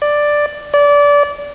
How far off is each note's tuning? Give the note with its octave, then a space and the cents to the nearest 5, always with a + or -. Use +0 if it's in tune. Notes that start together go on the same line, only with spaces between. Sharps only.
D5 +5
D5 -25